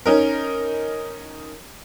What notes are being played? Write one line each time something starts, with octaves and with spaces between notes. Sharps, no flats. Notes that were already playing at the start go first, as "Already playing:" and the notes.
C#4 D#4 A#4